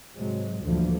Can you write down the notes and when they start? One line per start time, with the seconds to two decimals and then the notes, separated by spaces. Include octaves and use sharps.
0.16 G#2 C3 F#3 G#3
0.62 D2 G2 A#2 D3 E3 F3